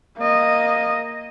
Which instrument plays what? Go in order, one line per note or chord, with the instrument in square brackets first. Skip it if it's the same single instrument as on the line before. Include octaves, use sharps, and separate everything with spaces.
[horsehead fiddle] A#3 D#5